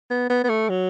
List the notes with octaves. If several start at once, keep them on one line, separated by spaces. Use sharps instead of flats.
B3
B3
B3
A3
F#3